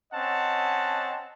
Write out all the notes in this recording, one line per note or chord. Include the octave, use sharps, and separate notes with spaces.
C4 C#4 D#5 F#5 A5